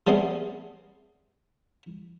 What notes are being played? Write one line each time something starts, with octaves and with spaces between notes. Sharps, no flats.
G3 A3 B3 C4 G#4